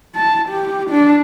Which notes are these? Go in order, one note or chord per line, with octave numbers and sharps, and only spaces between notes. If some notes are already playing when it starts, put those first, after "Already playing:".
A5
G4
D4